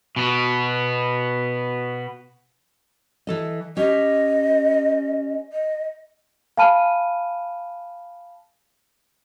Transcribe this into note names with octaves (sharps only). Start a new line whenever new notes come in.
B2 B3
E3 A4 D#5
C#4 G4 D#5
D#5
F5 G#5 A5 B5 F6 D#7